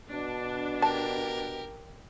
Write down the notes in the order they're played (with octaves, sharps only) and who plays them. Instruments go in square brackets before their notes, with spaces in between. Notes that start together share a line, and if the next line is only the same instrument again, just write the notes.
[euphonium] B2 [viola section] D4
[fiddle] G4 A#4 [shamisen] A5